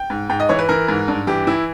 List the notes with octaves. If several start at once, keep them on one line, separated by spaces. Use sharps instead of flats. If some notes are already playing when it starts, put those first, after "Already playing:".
Already playing: G5
G#2
G#2 G5
D#5
E3 C#5
B4
E3 A#4
G#2
G2
E3 G4
E3 E4